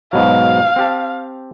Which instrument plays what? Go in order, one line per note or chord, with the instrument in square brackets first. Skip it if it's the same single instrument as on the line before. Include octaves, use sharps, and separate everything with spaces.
[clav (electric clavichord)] G#2 B2 F#3 [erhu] F5
[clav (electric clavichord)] C4 G4 A5